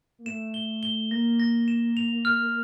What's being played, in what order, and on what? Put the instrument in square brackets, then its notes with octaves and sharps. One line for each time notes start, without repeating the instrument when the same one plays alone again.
[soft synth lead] A#3
[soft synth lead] A3 [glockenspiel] E7
[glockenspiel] G7
G7
[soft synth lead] A#3 [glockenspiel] A#6
[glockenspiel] A#6
E7
F7
F6